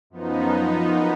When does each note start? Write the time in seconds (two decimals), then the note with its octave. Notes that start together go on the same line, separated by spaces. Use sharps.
0.10 F#2 F3 B3 D#4